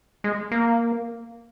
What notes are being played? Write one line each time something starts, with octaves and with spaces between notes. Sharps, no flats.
G#3
A#3